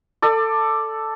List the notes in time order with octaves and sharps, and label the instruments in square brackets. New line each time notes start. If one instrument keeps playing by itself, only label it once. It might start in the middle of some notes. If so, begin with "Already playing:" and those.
[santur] A4 D5